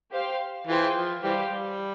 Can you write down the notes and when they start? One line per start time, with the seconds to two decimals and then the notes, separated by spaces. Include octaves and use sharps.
0.11 G4 C5 F5
0.67 E3 F4 G#4 C5 G5
0.95 F3
1.23 E3 G3 G4 C5 F5
1.51 G3